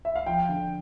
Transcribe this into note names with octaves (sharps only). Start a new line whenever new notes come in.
E5
F5
F3 G5
D3